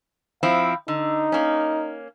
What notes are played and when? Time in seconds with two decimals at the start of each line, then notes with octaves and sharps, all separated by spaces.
0.43 F3 C4 E4 F5
0.88 D3 D#4
1.32 A#3 C#4